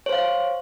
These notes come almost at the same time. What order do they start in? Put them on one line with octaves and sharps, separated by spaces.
C#5 C5 F5